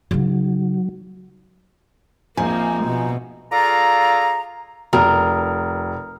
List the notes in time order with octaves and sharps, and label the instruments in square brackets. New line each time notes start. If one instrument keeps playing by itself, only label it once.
[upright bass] C#3 D#4 [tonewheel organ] F#3
[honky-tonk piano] A#1 G#5 [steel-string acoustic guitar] F3 [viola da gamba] A#3 C4 [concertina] D#4
[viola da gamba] B2
[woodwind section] F4 G#4 A4 D5 F5 A#5
[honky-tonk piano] F1 [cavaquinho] A#4